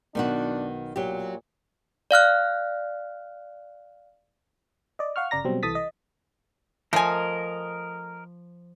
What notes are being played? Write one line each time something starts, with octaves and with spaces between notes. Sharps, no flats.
B1 D#3 B3 D4 F#4
A#2 F#3 G4
D5 F5 F6 F#6
D5 D#5
F5 F#5 C#6 F6
G1 C#3 D5 A#5 A#6
B2 F#3 G3 C4
C2 E3 A4 D#6 A6 B6
D#5
F3 A3 A#4 D#5 G#5